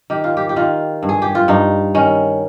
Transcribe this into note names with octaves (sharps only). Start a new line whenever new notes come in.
D#3 G4
F4
G4
G4
D#3 F4
G2
G#4
G4
F4
G2 D#4
D#3 C#4